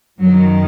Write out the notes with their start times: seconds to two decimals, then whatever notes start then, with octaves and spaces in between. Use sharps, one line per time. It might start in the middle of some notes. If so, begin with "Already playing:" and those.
0.20 F#2 D#3 F#3